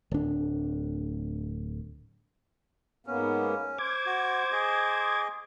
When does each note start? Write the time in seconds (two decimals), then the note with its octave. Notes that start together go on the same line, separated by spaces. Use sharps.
0.11 D1 D4
3.07 G#2 A#3 B3 C#4
3.78 C5 D6 G#6
4.06 F#4
4.52 G#4 D#5